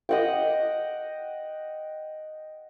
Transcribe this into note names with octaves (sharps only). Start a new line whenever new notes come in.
D#5 F#5 G5